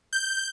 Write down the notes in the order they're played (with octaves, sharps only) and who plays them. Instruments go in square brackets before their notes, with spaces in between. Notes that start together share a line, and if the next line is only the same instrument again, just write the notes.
[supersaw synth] G6